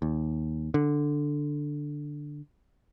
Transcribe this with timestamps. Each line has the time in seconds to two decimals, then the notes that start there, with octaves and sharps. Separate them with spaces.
0.02 D#2
0.74 D3